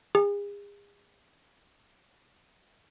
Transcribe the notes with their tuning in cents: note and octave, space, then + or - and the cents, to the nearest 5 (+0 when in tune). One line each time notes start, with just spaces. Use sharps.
G#4 -40